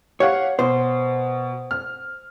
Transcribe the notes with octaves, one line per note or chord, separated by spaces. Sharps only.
G4 C#5 F5 F#5
B2 C5
F6